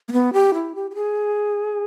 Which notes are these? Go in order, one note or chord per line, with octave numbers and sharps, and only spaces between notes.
A#3
B3
G4
E4
G4
G4
G#4